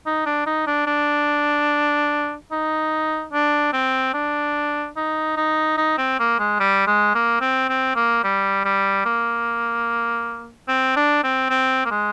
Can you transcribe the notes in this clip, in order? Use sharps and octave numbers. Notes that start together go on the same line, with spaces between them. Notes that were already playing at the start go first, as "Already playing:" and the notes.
D#4
D4
D#4
D4
D4
D#4
D4
C4
D4
D#4
D#4
D#4
C4
A#3
G#3
G3
G#3
A#3
C4
C4
A#3
G3
G3
A#3
C4
D4
C4
C4
A#3
G#3